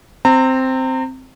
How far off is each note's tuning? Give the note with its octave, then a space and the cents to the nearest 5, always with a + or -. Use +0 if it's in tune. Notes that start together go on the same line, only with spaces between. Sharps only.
C4 +0 A#5 -35